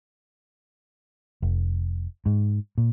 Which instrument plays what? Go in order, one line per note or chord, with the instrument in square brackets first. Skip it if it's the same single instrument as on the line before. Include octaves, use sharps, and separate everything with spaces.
[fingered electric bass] F1
G#2
A#2